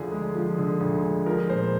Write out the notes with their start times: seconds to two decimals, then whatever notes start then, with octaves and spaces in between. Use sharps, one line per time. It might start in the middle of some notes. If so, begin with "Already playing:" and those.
Already playing: D2 D3 F3 G#4
0.12 G#3
0.36 F3
0.58 D3
0.81 D2
1.04 G#3
1.26 F3 A#4
1.49 A#2 C5